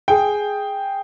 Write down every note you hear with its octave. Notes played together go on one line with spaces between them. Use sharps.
G#4 G5